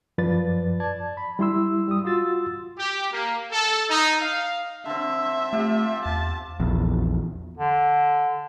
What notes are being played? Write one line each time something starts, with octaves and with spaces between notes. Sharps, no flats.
F#2 F3 B4 D5 A6
D5 A5 G#6
B5
G3 E4 C6 E6
G3 D#6
F4 F#4 C6 E6 A6
G4
A#3
A4
D#4
F5
D3 C4 E5
A3 F4 G4
E2 A5
A#1 E2
D3